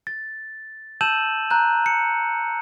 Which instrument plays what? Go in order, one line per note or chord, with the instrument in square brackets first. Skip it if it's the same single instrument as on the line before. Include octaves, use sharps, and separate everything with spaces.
[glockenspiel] A6
A5 E6 G6 D#7 E7 F#7
A#5 F#6 G6
C#7